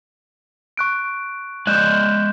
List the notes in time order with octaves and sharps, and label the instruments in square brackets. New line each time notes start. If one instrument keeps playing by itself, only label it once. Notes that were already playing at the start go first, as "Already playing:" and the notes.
[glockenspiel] C#6 F#6 D7
[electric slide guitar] G#3 D5 D#5 [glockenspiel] F#6 G6 E7